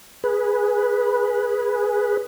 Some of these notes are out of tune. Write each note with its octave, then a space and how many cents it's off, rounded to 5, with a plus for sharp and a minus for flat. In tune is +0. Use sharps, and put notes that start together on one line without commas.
G#4 +0 B4 -10